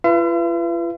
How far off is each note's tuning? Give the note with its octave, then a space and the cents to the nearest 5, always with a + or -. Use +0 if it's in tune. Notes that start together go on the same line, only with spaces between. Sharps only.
F4 -45 B4 +0 E5 +45